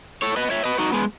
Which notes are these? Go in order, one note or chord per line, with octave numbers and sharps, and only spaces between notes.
A4 C#5
B4 D#5
C#5 E5
B4 D#5
D#4 F#4
G#3 B3